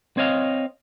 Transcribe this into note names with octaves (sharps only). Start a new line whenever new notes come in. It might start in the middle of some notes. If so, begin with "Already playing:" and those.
C4 C#5 D#5 F5